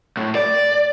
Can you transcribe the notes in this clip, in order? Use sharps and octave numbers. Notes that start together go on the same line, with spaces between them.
A2
D5